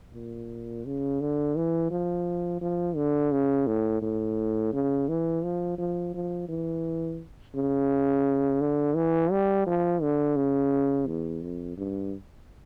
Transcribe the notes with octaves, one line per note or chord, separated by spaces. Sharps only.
A#2
C#3
D3
E3
F3
F3
D3
C#3
A2
A2
C#3
E3
F3
F3
F3
E3
C#3
D3
E3
G3
F3
D3
C#3
E2
F2
G2